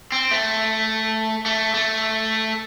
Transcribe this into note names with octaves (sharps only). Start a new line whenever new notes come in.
C4
A3
A3
A3